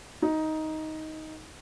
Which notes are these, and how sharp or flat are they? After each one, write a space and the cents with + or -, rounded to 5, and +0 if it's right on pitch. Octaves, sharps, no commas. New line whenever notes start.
D#4 +10